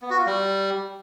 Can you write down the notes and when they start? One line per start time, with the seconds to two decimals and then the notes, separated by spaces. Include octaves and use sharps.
0.02 B3
0.10 F#4
0.18 F4
0.26 G3